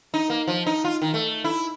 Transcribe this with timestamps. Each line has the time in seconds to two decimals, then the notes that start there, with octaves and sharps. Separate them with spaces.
0.14 D#4
0.30 A#3
0.47 F3
0.66 D#4
0.84 F4
1.02 D#3
1.14 A3
1.44 E4